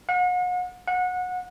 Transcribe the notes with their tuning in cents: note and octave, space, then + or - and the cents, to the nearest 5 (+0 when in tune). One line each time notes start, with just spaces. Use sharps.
F#5 -40
F#5 -25